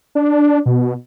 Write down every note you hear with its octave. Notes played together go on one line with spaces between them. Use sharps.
D4
B2